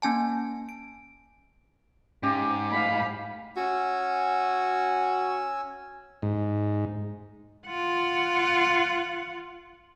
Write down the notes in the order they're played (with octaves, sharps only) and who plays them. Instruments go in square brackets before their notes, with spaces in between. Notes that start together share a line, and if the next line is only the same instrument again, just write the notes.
[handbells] A#3 C#4 G#5 A5
D7
[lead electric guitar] G#2 [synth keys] C#4 F5 C6 [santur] G4
[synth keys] A3 [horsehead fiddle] F5 B5
[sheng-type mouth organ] C#4 G#5 E6 [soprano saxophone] F#4
[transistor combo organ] G#2
[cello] F4 F#5